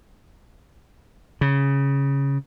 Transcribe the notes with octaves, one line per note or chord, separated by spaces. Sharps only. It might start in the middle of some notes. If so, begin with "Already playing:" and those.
C#3